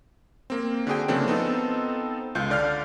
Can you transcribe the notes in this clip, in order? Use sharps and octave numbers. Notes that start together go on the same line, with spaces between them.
A#3 C4
D3 F#4 G#4 G5
C#3 F3 A3 A#3 C4 D4
B3 C4 D#4 F4 A4
C#2 F4 G6
D3 D5 F5 F6